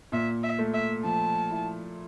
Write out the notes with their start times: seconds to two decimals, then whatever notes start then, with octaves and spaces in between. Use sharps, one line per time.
0.12 A#2 E5
0.43 E5
0.59 A3
0.74 E5
1.04 F3 A5
1.50 E4